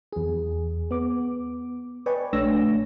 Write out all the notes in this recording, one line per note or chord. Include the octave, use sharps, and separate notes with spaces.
E2 G#4
B3 D6
B4 D5 D#5 G5 G#5 C#6
A#1 A3 D4 C#5 E6 A#6